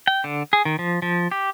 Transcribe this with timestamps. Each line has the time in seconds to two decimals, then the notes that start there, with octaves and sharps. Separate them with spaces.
0.07 G5
0.24 D3
0.53 G#4
0.65 D#3
0.79 F3
1.02 F3
1.32 G4